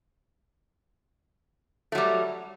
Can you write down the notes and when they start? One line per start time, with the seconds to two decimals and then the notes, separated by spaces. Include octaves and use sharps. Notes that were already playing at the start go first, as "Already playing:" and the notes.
1.92 A3
1.95 F#3
1.98 G3